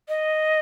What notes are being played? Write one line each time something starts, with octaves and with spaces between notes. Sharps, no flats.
D#5